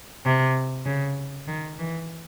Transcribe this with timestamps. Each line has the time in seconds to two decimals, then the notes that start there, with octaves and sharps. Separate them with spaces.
0.25 C3
0.86 C#3
1.47 D#3
1.79 E3